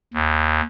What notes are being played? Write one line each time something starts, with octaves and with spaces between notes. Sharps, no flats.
D#2